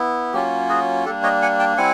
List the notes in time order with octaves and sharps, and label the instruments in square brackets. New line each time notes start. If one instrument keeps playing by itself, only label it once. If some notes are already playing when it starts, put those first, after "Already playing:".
Already playing: [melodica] B3 E4
F#3 A#3 C#4 F4 G4
F#4 G#4
G3 A#3 D4 G4 A4
C#5 D#5
F#5 G#5
G5 A5
G3 C4 E4 F#5 G#5